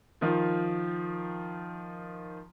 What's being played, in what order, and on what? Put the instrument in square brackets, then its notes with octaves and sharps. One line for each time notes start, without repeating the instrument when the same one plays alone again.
[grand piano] D#3 F3 F4